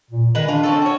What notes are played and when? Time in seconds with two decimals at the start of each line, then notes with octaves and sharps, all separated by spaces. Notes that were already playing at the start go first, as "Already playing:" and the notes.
0.10 A#2
0.35 D#3 G#3 B4
0.48 D4 F4
0.63 C4 C#4 A4
0.82 F#4 C#5